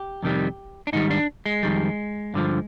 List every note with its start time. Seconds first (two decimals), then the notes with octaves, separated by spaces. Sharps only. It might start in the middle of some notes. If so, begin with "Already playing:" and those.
Already playing: G4
0.23 F2 C3 D#3 G3
0.87 D4
0.93 G#2 D#3 G3 D#4
1.10 D4
1.46 G#3
1.63 F2 D#3 G3
2.34 G2 D3 F3